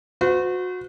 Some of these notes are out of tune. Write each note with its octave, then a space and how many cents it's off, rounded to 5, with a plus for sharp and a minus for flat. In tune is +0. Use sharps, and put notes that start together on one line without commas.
F#4 -25 C5 -45